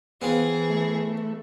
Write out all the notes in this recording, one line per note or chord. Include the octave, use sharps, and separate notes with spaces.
E3 B3 C4 F4 G#4
A3